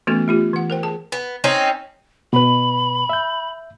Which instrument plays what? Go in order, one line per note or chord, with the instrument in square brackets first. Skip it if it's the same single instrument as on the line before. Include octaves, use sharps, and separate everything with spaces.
[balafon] E3 A3 B3 C#4 F#4 A4
A3 F4 G4
E3 F#5
A#4 C5 G5
G#4 A5
[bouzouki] B3
C4 C#4 D#4
[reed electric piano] B2 B4 [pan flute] B5
[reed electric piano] E5 G6